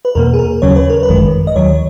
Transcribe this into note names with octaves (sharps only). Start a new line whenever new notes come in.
B4
E2 B2 A#3 A#4
G#4
A#4
D#2 C#3 F#3 C#4 C#5
B4
A#4
B4
G#1 F#2 D#3 G#3
D#5
D#2 D#3 F#3 C#5